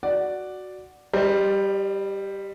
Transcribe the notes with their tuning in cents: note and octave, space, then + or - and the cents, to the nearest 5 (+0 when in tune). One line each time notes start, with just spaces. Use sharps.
F#4 +0 D5 +0 F#5 +0
G3 +0 C5 +0 D#5 -45